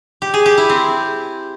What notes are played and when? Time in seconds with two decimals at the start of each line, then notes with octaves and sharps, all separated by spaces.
0.22 G4
0.34 G#4
0.46 G4
0.58 E4
0.70 C4